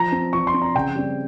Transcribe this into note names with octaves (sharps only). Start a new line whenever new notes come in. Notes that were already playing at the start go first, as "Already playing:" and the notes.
Already playing: F3 A#5
C4
F3 C#6
C6
C4
A#5
C#3 G5
G3 C4